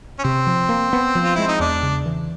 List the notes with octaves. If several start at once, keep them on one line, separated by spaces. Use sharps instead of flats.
C#4
C3 C4
F3
A#3
B3
F3
F4
G#3 E4
D#4
E2 D4
C#3
E3